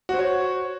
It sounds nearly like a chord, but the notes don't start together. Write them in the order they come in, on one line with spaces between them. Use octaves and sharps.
F#4 C5 C#5